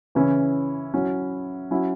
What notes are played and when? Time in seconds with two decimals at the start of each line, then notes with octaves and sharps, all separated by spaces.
0.15 C#3 E3 C#4 E4
0.94 F#3 C#4 E4
1.71 F#3 C#4 E4